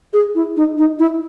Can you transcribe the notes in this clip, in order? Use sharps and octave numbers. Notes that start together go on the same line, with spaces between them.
G#4
E4
D#4
D#4
E4